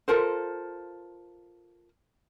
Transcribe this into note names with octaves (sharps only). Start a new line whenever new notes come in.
F4 A4 A#4 C5